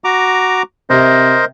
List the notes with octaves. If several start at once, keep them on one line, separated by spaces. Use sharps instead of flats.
F#4 A#5 D6
C3 A#4 C5 D#5